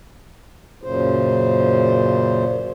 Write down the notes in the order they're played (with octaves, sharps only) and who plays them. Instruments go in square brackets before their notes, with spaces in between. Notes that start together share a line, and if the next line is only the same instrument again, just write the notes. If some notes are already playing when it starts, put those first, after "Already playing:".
[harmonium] F#2 A#2 C#3 C5